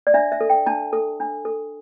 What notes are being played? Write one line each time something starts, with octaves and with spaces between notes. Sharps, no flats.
D5
D4 E5
E5
A4
G5
D4 A5
A4
D4
A4